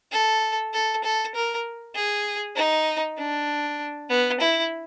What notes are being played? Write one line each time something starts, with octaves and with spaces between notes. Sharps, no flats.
A4
A4
A4
A#4
G#4
D#4
D4
B3
E4